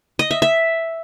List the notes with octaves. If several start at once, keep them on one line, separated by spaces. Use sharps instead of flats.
D#5
E5
E5